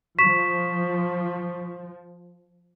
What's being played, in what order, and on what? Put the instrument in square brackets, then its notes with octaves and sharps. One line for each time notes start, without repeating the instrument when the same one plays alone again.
[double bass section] F3 [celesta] C#6 B6 E7